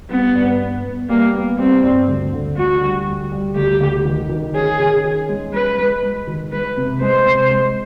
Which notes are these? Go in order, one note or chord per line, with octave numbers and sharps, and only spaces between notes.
G3 B3
G2
B3
B3
G3 A#3
B3
G3 C4
G2
D2
D3
D2 F#4
G3
D2
G3
D2 G4
D2
D#3
D#3
C#4 G#4
D#3
C#4
G#3
G#3 B4
G#3
G#3
D#3
G#3 B4
C3
G#3 C5
C3
G#3